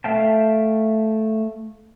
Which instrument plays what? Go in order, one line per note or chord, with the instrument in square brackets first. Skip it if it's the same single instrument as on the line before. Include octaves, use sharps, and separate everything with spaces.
[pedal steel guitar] A3 E5 F5 G5 A5